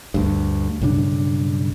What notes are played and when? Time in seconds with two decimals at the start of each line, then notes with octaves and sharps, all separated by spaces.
0.14 D2 G2
0.81 B1 G2 C#3 D4